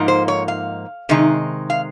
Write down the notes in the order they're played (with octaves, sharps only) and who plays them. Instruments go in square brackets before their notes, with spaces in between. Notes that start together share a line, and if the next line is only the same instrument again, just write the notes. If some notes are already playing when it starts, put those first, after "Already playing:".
Already playing: [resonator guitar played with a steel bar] G#2 F3 A#3 D#4
C5
C#5
F5
C3 D#3 G#3 D#4
F5